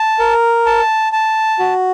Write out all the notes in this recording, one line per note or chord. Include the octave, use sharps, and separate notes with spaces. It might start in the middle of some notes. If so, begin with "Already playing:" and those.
Already playing: A5
A#4
A5
A5
F#4